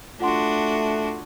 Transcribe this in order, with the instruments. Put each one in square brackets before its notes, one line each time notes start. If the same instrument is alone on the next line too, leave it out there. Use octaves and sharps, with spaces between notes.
[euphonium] A3 [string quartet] D4 F#4 [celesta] F4 F#5 C6